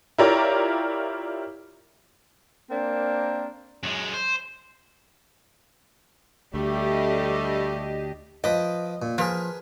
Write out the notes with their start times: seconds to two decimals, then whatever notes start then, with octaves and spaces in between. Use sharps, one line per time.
0.18 E4 F4 G4 A#4 C#5 D5
2.71 A#3 C4 D4 A#4
3.83 F#2 G#3
4.14 C5
6.54 D2 G3 A3 D4 G4 D#5
8.44 F3 B4 D#5 D6
9.02 A#2
9.18 F3 G#4 A#4 B4